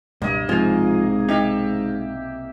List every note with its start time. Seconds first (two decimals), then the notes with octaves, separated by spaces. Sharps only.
0.22 C#2 G2 B2 A#3 D#5
0.49 B1 G#2 C3 F3 C4 F4 G#4
1.29 D#4 G4 E5 F5